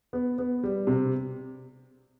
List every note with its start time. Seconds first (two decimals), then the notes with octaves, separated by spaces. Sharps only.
0.13 B3
0.38 B3
0.63 G3
0.87 C3